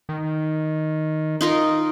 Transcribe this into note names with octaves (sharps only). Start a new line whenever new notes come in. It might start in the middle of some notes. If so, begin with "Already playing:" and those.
D#3
D#4 F4 A#4